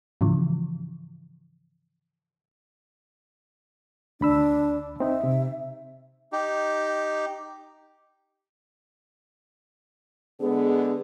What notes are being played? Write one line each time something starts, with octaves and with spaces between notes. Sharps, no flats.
G#2 C#3 E3 F3
D2 D4 B5 E6
C4 D#4 E5
C3
D#4 G4
D3 G#3 B3 G#4